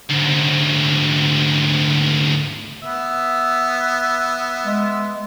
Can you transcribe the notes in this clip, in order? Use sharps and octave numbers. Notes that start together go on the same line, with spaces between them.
D2 G#2
B3 E5
G#3